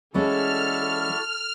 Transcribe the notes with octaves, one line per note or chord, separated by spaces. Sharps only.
E3 G#3 C#4 E4 F#4 A4 D5 F6